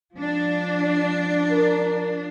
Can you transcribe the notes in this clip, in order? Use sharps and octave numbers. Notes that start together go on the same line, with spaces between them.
F3 D4
A#4